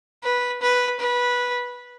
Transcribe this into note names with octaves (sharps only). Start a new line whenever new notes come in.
B4
B4
B4